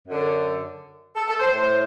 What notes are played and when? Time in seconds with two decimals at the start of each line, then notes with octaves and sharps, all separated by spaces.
0.06 F#2 D3
1.16 A4
1.27 A4
1.39 C5
1.52 A2 C5